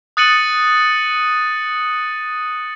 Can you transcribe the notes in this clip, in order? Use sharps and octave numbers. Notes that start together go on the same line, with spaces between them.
D#6 F#6 A6 C#7 D#7 F#7